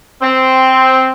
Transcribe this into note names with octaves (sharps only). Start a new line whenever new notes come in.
C4